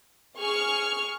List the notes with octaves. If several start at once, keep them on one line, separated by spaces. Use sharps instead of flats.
G#4 C#6 F6